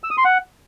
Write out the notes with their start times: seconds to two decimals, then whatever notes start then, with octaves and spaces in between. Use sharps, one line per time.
0.04 E6
0.11 D#6
0.18 C6
0.25 F#5